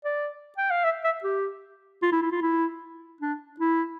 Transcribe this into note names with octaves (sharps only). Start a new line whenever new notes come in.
D5
G5
F5
E5
E5
G4
F4
E4
E4
F4
E4
D4
E4